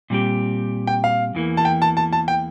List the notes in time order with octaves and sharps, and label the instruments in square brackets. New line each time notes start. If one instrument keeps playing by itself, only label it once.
[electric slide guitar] A#2 G3 C4 G4
[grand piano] G5
F5
[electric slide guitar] E2 E3 A#3
[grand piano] A5
G5
A5
A5
A5
G5